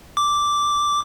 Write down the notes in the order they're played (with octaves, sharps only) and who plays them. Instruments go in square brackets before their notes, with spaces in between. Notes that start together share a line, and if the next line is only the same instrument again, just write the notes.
[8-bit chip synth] D6